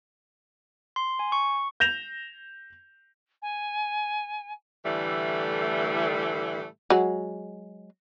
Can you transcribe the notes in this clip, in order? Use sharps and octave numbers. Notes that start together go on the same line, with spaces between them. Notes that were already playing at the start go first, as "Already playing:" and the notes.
C6
G#5
C#6
G6 A#6 E7 F7
G#5
A2 D3 E3 G3 A3
F#3 G#3